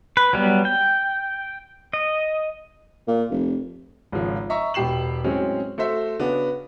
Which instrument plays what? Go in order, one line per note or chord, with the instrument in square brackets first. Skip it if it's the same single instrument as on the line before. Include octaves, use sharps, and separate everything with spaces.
[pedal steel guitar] B4
F#3 G3 B3
G5
D#5
[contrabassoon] A#2
F1
[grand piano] G#1 C#3 F3
D#5 E5 A#5 C#6
E1 B2 G4 C7 E7 F#7
A2 F#3 G#3 C4 C#4
A3 F#4 C5 E5
C#3 B3 D4 F#4